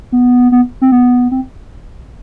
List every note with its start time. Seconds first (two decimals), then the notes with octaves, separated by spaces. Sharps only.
0.12 B3
0.52 B3
0.82 C4
0.92 B3
1.31 C4